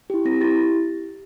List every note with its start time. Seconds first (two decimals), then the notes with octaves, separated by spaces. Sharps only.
0.10 E4 G4
0.25 C4 A#6
0.40 E4 G4 A6